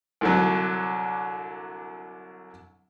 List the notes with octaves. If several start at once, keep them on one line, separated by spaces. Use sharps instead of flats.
C2 D3 F#3